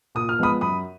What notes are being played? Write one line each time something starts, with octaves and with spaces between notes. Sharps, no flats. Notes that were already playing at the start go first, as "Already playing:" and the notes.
A#2 D#6
F6
F3 G#3 B3 B5 D#6
F#2 B5 D#6